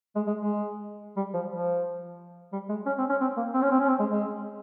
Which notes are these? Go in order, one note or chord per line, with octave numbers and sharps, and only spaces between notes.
G#3
G#3
G#3
G3
F3
F3
G3
G#3
C#4
C4
C#4
C4
A#3
C4
C#4
C4
C#4
C4
G#3
G#3